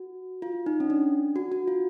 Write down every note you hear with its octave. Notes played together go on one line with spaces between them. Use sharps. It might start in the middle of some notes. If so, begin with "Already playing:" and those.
Already playing: F#4
F4
D#4
C#4
D4
F#4
F#4
F4